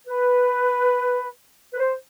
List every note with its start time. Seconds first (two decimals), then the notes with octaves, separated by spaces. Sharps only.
0.08 B4
1.74 B4
1.80 C5